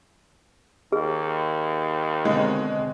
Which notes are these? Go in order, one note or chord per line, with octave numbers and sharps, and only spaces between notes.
D#2 G#4
B2 D3 G#3 C4